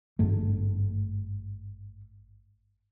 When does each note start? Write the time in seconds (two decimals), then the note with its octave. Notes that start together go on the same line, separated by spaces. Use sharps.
0.19 G#1 G2 A3